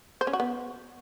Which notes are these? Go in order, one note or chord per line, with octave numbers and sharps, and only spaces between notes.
C5
C#4
F#4
B3